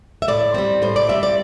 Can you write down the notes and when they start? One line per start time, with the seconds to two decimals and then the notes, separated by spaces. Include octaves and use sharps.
0.22 E5
0.28 A2 D5
0.54 G3 C4
0.82 A2 C5
0.96 D5
1.09 G3 C4 E5
1.23 D5